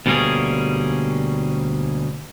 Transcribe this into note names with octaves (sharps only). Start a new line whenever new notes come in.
D2 B2 G3 A#3 C#4 G#4